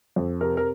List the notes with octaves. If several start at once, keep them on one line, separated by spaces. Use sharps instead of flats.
F2
C3 A#4
A#4